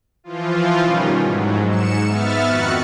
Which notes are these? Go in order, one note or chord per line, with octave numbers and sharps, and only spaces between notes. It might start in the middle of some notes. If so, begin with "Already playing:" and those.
E3 F3 F4
B2 D#3 G3 C#4
G#2 F#3
G#2 C#7 E7
B3 E5 F6 A6
F2 D#3 F#4 F#6 C#7